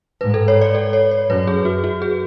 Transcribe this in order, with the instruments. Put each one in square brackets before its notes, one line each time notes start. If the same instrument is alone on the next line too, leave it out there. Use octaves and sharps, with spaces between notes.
[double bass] G#2 [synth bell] B4
[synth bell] A4
C#5
D5
A4
C#5
C#5
[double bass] F#2 [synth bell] B4
[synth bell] G#4
F#4
F#4
G#4